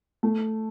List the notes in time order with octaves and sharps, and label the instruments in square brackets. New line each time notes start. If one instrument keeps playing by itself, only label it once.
[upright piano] A3